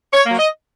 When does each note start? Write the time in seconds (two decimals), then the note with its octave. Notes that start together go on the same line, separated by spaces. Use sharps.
0.13 C#5
0.26 F#3 A#3
0.39 D#5